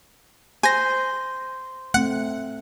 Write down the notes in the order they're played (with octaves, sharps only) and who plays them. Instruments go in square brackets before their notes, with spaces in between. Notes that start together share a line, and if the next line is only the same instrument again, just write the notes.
[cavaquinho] C5 [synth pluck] G#5 A#6
[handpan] A3 C4 [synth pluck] F#5